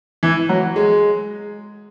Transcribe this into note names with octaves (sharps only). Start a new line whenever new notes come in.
E3
F#3
G#3